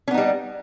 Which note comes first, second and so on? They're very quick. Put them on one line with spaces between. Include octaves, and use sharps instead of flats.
C#4 B3 D#4 G3